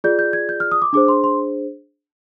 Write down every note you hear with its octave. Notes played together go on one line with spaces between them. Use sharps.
F4 G#4 D5 G6
G6
G#6
G6
F6
D#6
D6
D4 G#4 C5 D6
C6
C6